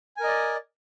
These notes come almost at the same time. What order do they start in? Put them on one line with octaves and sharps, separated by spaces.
G#5 A#4 D#5 D5